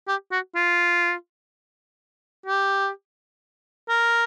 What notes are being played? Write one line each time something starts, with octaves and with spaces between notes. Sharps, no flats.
G4
F#4
F4
G4
A#4